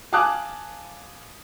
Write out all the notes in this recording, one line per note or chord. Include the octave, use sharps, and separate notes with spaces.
F5 G#5 A5 D6 D#6 F#6